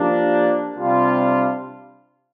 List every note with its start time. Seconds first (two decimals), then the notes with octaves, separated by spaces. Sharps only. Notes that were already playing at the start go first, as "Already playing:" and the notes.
Already playing: F3 A#3 D4 G4
0.76 C3 G3 D4 F4